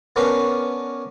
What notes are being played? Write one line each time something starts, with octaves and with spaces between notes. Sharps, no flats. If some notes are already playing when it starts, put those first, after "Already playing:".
B3 C#4 D4 A#4 B4